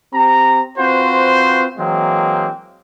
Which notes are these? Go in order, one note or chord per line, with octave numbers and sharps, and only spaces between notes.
C4 G4 A#5
C4 F4 F#4 B4 C5
E3 F#3 G#3 A#3 C4